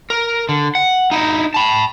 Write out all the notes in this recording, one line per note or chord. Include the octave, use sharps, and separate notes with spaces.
A#4
D3
F#5
D#4 E4
A5 B5